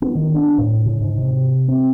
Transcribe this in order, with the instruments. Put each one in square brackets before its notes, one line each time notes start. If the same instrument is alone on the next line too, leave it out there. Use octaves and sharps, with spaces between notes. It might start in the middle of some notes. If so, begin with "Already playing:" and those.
[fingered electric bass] B3
D#3
D4
A2
C#3
G#2
C3
C4